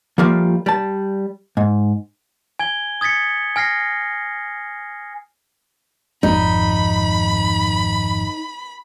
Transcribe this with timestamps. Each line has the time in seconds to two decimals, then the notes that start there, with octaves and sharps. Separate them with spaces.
0.18 F3 G3 A3 A#3 F4
0.66 G3 A5
1.57 G#2
2.59 G#5 G#6 G7
3.01 D#6 G#6 A6 B6 C#7
3.56 G#5 F6 A#6 C7
6.23 G#1 F2 D#4 B5